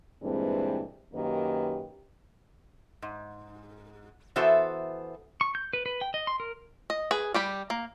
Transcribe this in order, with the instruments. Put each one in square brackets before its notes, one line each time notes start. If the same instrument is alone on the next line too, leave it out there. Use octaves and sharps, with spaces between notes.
[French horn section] G2 A#2 E3 G#3 C4
F#2 D#3 A#3 G4 B4
[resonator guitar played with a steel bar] G#2
E3 B3 F#4 A4 C5 E5
[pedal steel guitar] C#6
G6
B4
B4
G5
D#5
C6
A#4
[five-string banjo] D#5
G#4 B4
G3 G4 B5
A#3